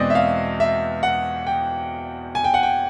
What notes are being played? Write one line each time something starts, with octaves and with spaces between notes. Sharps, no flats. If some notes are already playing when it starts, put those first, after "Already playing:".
Already playing: E2 B2 G#3 C4 D5 D#5
E5
F5
E5
F#5
G5
G#5
G5
F#5
G5